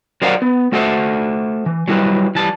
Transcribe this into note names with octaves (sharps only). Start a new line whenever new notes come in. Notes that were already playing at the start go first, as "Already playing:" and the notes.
F#3 A#4 C5 D5 F5 F#5
B3
A3 F#4 A4 C5 E5
E3
F#3 G3 E4 A#4 B4
E3 G3 A5